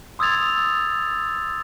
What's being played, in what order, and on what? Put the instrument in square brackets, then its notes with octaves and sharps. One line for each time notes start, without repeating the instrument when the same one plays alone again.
[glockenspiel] C6 D#6 E6 G#6 A6 F7